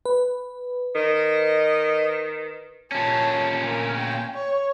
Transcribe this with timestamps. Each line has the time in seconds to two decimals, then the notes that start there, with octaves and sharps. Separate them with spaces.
0.05 B4
0.95 D#3 D#5
2.92 A#2 C#4 A5
3.65 A#4
3.97 G5
4.34 C#5